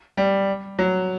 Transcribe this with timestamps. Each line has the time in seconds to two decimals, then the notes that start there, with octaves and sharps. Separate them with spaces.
0.17 G3
0.79 F#3